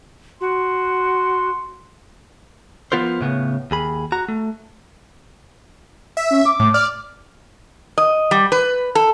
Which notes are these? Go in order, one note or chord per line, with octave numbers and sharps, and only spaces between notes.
F#4 C6
F3 G#3 B3 F4 A#4 C5
A2 C#3 B3
D#2 G#4 B5
F#4 A#5
A3
E5
C#4
D6
A2
D5 F6
D#5
G3
B4
A4